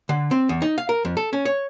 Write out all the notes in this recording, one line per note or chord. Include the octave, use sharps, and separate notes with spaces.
D3
C4
E2
D#4
F5
A#4
F2
A4
C#4
C#5